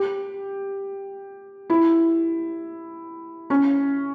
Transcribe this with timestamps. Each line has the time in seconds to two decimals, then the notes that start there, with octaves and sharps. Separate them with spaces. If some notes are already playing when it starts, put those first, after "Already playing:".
Already playing: G4
1.70 E4
3.50 C#4